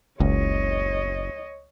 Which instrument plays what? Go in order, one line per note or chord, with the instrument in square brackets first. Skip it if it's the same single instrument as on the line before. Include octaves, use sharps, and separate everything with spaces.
[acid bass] F#1 [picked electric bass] C#2 [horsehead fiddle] C#5 D#5